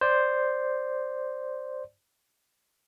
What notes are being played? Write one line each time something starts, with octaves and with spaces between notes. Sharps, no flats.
C5 D5